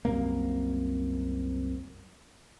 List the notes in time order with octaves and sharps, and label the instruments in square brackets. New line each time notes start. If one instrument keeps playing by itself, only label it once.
[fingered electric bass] C2 F#2 C3 A#3